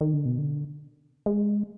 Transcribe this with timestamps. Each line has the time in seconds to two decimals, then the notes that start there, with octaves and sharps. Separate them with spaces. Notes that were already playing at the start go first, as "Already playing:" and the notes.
0.01 D#3
0.14 D3
0.25 B2
0.38 D3
1.26 G#3